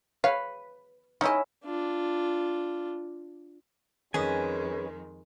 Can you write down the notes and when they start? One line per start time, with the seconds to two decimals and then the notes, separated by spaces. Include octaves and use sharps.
0.24 B4 C#5 F5
1.21 C#4 D#4 E4 D#5
1.64 D4 F4
4.14 F2 D#3 G#3 C#4 G#4 B4 D#5 G#5